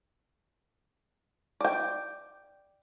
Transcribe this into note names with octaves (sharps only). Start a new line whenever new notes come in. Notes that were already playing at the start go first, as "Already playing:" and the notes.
D5 G5